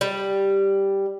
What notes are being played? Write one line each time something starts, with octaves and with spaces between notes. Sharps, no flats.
G3